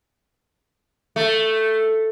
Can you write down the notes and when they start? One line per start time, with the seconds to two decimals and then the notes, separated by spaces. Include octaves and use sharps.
1.16 A3